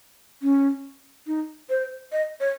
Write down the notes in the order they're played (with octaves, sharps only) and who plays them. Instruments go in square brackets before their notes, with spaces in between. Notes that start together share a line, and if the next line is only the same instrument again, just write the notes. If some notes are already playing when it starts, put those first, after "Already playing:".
[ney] C#4
D#4
C5
D#5
C#5